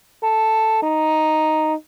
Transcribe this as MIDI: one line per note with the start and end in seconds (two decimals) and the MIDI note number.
0.23 0.82 69
0.83 1.74 63